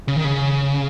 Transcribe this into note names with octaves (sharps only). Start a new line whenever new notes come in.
C#3
D#3
C#3